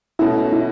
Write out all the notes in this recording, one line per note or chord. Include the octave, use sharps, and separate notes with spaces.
B2 A3 C#4 E4 F#4
E4